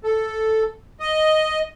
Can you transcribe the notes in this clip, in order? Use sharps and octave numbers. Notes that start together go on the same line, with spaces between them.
A4
D#5